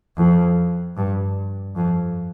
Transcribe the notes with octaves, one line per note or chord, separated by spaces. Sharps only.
F2
G2
F2